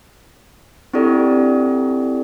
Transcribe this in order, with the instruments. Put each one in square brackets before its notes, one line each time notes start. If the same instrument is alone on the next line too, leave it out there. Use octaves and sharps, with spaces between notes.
[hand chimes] C4 D4 E4 G4 A4 D5